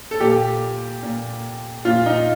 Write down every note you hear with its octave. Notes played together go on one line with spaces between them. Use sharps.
A4
A#2 G4
A#2
A#2 F4
D#4